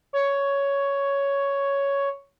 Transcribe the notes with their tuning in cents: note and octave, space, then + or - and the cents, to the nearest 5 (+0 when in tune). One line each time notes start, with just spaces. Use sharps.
C#5 +5